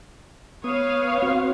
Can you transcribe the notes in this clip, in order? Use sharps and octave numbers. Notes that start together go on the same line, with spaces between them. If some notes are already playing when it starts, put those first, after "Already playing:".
B3 B4 C#5 F5 D#6
C4 F#4